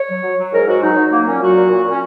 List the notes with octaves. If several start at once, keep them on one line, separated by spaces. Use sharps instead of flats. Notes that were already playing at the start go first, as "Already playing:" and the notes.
Already playing: C#5
F#3
F#3
F#3
G#2 A#4
G#2 F#4
F#3 D#4
F#3
F#3 A#3
A#2 C#4
F#3 F#4
A#2
A#2
A#2
C#4